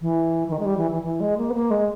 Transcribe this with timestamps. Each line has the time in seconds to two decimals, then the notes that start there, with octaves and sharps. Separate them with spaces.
0.01 E3
0.48 E3
0.52 D#3
0.59 G#3
0.65 G3
0.77 E3
0.91 E3
1.03 E3
1.20 G#3
1.38 A#3
1.50 B3
1.54 A#3
1.71 G#3